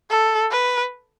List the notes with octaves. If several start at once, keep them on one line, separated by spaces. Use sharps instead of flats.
A4
B4